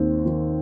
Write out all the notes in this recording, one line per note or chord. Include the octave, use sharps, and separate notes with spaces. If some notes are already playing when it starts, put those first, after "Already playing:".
Already playing: D#2 C4
D#3